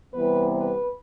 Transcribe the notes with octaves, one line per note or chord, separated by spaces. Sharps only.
C3 E3 G3 B3 B4
B4